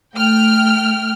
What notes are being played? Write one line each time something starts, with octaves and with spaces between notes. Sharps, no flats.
A3 G5 F6